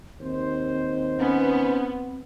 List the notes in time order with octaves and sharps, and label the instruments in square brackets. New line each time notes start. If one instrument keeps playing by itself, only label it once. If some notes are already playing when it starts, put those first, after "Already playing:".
[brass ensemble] D#2 D#4 C5 [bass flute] C4
[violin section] B3 [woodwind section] C#4